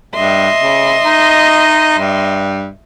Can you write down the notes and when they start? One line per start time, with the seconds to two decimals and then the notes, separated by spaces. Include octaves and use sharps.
0.14 G2 D#5 E5 C6
0.60 C#3
1.05 D#4
1.99 G2